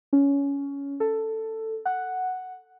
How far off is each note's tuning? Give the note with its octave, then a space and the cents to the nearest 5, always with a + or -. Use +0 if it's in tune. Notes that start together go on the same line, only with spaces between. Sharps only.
C#4 +15
A4 +10
F#5 +0